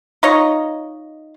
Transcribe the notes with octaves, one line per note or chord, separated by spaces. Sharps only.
D#4 F4 C#5 D#5